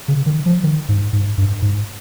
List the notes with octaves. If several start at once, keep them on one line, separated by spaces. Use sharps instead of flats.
C#3
D#3
F3
D#3
G#2
G#2
G2
G#2